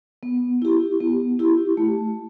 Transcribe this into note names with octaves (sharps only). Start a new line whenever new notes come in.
B3
E4 G4
B3
E4 G4
A3